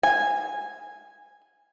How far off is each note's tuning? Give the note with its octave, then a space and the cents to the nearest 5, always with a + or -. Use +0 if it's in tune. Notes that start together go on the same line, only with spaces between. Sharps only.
G#5 -10